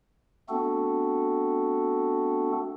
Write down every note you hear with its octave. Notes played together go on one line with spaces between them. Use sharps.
A3 B3 C4 D4 F#4 A4